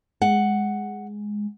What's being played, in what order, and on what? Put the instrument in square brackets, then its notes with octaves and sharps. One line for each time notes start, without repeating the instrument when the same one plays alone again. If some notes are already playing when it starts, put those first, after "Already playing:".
[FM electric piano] G#3 [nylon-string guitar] F#5